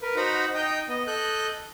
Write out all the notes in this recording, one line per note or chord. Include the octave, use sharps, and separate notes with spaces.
A#4 B4
D#4 F#4 C5 F#5 A#5 B5
D#4 D#5 G5 G6
B3 D#5
A4 D#5 F#6 G6